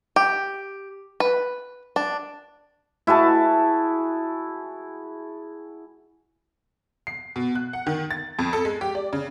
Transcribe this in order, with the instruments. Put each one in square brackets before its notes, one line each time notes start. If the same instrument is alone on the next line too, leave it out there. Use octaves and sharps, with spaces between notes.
[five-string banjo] G4
B4
D4
[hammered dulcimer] E4 F#4 G#4 A5
[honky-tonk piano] C7
B2
F#6
F#5
D#3
A6
F2
A4
G#3
G4
D5
C#3